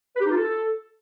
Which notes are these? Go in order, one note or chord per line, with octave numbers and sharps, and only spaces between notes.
B4
G4
D#4
F4
A4